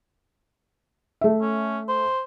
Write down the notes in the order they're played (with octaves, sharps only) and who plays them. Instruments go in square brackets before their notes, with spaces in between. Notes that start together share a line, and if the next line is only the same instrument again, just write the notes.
[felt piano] A3 E5
[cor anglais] C#4
C5